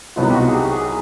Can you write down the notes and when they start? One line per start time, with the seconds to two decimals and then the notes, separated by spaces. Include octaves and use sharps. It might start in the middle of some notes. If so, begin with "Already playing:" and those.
0.16 C2 B2 F#3 B3 D#4 F4
0.30 G4
0.36 F#4
0.48 G#4
0.54 G4
0.73 G#4